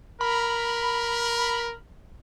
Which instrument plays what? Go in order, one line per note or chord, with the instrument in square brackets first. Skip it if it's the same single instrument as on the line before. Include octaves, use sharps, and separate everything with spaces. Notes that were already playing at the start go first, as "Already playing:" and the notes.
[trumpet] A#4 [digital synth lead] B5